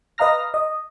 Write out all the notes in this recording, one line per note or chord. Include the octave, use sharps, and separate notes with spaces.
B4 D#5 F5 A#5 F6 A#6
D#5